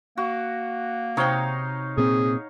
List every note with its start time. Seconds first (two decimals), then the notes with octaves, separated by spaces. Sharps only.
0.18 A#3 F#4
1.17 C3 D#4 C#5 F5 G5
1.97 A#2 C4 G#4